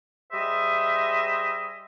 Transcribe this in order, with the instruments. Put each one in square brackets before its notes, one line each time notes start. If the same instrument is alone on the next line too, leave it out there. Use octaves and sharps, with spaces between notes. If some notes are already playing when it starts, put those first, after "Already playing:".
[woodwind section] G3 G#4 C5 D#5 E5